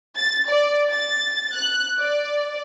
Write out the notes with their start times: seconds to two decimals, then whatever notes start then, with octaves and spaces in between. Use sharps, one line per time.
0.17 A6
0.49 D5
0.92 A6
1.55 F#6
2.00 D5